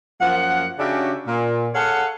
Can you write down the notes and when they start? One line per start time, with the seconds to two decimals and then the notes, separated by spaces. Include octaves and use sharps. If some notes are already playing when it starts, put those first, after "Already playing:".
0.20 F#2 F3 A#3 F#5
0.79 C#3 C#4 D4 F#4 G4 E5
1.26 A#2
1.74 G#4 A4 C#5 F5 F#5